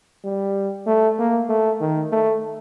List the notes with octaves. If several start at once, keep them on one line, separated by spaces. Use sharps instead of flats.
G3
A3
A#3
A3
D#3
A3